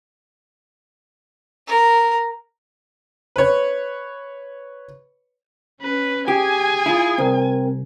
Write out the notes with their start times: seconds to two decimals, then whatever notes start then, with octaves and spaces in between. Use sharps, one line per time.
1.67 A#4
3.36 B4 C#5
5.81 C#4 B4
6.28 G4 G#4 G#5
6.86 E4 F4
7.18 C2 C4 A#4